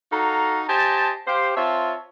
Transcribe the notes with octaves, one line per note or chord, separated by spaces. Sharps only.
D#4 F#4 A4 F5 A#5
G4 C5 D#5 G#5 A5
G4 C5 F5
C4 F4 C#5 E5 A5